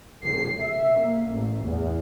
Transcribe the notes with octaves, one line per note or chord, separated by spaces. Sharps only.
C7
E5
A#3
A1
E2